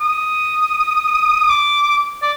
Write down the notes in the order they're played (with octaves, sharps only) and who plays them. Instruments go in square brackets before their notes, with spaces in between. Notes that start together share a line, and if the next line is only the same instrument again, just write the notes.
[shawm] D#6
D6
D5